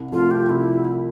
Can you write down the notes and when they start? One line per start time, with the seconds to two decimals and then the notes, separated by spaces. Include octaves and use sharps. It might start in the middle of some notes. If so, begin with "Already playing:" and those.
Already playing: C2
0.12 C3 F3 A3 F4
0.31 G4
0.49 C2 E4